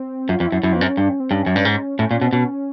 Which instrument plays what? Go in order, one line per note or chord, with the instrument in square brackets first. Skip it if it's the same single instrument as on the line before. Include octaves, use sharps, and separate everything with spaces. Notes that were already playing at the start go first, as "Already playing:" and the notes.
Already playing: [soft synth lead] C4
[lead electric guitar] F#2 [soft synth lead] F4
[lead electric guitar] F2
[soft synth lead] E4
[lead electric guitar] F#2
[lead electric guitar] F#2 [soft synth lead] E4
[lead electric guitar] F2
[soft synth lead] B3
[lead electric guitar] F#2 [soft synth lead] C4
[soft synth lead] C#4
[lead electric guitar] G2 [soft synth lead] D4
[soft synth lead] C#4
C4
[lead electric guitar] G2 [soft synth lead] C#4
[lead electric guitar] F#2
G2
G#2
[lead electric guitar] A2 [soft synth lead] C#4
[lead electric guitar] A#2
B2
[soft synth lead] C4
[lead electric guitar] B2 [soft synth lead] C#4